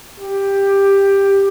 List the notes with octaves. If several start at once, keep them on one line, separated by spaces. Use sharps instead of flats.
G4